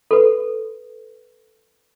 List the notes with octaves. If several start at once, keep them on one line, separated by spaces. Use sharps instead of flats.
A4 B4